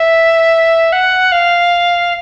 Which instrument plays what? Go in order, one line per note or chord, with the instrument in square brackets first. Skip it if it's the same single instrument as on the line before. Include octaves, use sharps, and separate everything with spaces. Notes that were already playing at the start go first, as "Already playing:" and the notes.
Already playing: [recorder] E5
F#5
F5